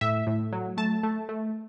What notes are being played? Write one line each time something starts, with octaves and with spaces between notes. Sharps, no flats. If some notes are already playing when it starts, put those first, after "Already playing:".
A2 E5
A2
F#3
A3 A5
A3
A3